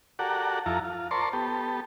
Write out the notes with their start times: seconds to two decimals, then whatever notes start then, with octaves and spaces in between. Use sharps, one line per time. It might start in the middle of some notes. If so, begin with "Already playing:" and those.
0.19 F#4 G4 A4 A#4 D5 F#5
0.66 F2 E4 F4 A4 A#5
0.84 F4
1.11 A#4 C5 D5 A5 C6 C#6
1.33 B3 G4 A4